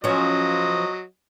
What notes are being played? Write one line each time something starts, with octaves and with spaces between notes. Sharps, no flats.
F3 F#3 C#4 D#5